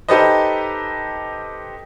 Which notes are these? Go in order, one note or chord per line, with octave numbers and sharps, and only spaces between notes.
D#4 G4 A4 B4 C5 D#5